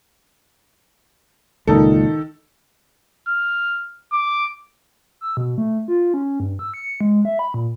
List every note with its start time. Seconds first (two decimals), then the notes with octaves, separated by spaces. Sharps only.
1.67 C#2 A#2 D#3 D#4 A4
3.28 F6
4.13 D6
5.21 E6
5.37 B2
5.58 A3
5.88 F4
6.14 C#4
6.40 G2
6.59 E6
6.74 C#7
7.01 G#3
7.25 E5
7.39 B5
7.54 A#2